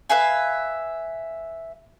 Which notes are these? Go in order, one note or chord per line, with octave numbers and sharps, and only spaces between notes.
B4 E5 F5 G#5